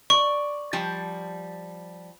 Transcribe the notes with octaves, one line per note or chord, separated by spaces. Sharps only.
D5 C#6
F3 G3 A5